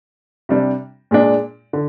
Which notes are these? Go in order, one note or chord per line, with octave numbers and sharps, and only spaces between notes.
C3 G3 D4
A#2 G#3 D4
D3